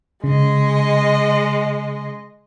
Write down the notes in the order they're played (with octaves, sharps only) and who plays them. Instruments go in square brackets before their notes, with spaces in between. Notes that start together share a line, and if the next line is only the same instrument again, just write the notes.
[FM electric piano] C#3 [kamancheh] G#3 D#5